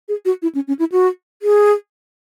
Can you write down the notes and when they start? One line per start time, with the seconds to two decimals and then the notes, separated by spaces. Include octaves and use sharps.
0.09 G#4
0.25 F#4
0.42 E4
0.55 C#4
0.68 C#4
0.79 E4
0.92 F#4
1.42 G#4